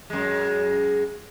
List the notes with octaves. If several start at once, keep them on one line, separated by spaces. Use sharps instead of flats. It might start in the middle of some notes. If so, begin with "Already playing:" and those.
F#2 G#3